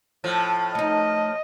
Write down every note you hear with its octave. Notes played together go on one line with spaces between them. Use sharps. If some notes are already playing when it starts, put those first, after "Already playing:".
A2 F3
A3 D#4 D#5